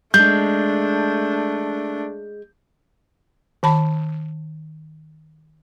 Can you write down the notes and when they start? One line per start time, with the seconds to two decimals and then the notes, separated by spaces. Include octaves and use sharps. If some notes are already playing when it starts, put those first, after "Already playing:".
0.14 G#3 A3 D4 G6
3.63 D#3 A5 B5